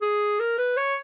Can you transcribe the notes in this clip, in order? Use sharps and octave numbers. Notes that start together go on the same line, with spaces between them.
G#4
A#4
B4
C#5